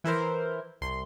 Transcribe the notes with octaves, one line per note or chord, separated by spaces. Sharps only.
E3 E4 A#4 C5
C2 C6